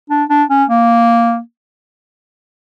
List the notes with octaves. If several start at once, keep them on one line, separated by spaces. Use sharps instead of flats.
D4
D4
C#4
A#3